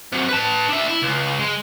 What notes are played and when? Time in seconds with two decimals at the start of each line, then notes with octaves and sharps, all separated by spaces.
0.13 C3 F#3
0.29 B4 A5
0.69 D4 E5
0.88 E4
1.02 C#2
1.39 G#3